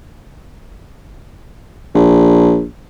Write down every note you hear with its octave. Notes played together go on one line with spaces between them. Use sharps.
A#1